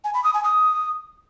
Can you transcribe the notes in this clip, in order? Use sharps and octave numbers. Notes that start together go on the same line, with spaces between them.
G#5
B5
D#6
G#5
D#6